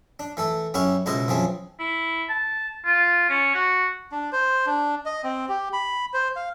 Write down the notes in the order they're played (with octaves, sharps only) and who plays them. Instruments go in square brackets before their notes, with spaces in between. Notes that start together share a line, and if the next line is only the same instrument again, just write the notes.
[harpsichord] D4
E3 A3 A4
F#2 C#4 E4 G4 F#5 C#6
C#2 B2 E4 C5 D#5
F#2 E3 F3 C4 G#4
[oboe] E4
A5
F4
C#4
F#4
[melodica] D4
C5
D4
D#5
C4
G4
B5
C5
F5